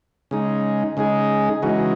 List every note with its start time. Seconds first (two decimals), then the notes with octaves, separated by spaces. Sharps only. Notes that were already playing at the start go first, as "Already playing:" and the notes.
0.31 C#3 G#3 D#4
0.97 C#3 G#3 D#4 G#4
1.62 C#3 E3 G#3 D#4 F#4